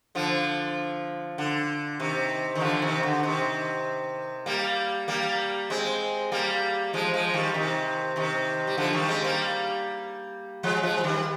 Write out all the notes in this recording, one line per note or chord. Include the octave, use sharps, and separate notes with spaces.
D3 F3
D3
C3 D#3
D#3
D3 F3
C3 D#3
D3
C3 D#3
G3 A#3
G3 A#3
G#3 C4
G3 A#3
F3 G#3
F3 G#3
D#3 G3
C3 D#3
C3 D#3
G3
D3 F3
D#3 G3
G#3 C4
G3 A#3
F3 G#3
F3 G#3
F3
D#3 G3